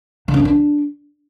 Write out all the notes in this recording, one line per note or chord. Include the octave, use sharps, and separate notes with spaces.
D3
C#4
D#3
D4